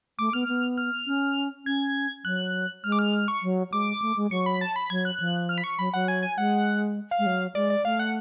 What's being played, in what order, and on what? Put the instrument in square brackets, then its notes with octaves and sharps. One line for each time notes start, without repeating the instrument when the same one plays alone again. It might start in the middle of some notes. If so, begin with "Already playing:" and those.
[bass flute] A3 [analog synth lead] D6
[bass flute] B3 [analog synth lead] F6
[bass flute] B3
[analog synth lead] F6
[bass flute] C#4
[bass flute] C#4 [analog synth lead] G#6
[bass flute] F#3 [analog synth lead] F#6
[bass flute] G#3 [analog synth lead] F6
[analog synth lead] D6
F6
F6
C#6
[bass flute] F#3
[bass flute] G#3 [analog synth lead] D6
[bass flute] A3
G#3
[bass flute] F#3 [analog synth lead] C#6
[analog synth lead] B5
A5
B5
[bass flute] F#3 [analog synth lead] G#6
[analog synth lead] F#6
[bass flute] F3
[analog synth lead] F6
B5
C#6
[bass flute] F#3 [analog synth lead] B5
[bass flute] F#3 [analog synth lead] F#5
[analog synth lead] G#5
G#5
[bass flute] G#3 [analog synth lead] F#5
[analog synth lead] F5
[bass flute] G#3
F#3
[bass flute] G#3 [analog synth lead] D5
[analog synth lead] D5
[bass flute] A3 [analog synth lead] F5
[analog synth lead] F#5